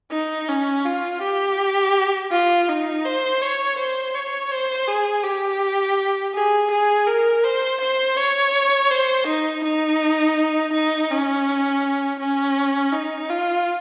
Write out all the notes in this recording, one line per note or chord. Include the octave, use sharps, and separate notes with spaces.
D#4
C#4
F4
G4
F4
D#4
C5
C#5
C5
C#5
C5
G#4
G4
G#4
G#4
A#4
C5
C5
C#5
C5
D#4
D#4
D#4
C#4
C#4
D#4
F4